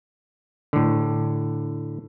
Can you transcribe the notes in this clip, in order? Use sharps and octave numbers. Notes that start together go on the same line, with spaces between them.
A2 D3